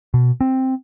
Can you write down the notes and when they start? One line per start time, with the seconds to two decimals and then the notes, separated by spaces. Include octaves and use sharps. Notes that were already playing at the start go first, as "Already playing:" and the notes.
0.14 B2
0.41 C4